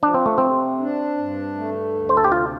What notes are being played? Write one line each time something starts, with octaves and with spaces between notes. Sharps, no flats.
F3 D4
C4
A3
C3 C4
D4
G2
A3
D2
C5
A4
G4
C3 F4